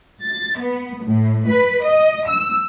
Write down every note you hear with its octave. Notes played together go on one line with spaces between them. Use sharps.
A6
B3
A2
B4
D#5
E6